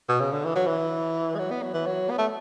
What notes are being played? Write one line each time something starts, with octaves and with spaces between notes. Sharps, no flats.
B2
C#3
D3
E3
F#3
E3
G#3
F#3
B3
F#3
E3
F#3
B3
A3